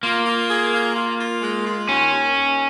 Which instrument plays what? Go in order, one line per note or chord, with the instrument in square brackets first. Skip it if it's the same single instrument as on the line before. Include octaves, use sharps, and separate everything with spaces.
[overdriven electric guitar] A#3 [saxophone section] F4
[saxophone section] F4
G#4
F4
F4
F4
G#3
F4
[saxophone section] D#2 [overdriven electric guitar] C#4
[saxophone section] D#2
D#2